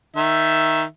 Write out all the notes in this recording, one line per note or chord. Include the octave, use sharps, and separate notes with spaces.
D#3 E5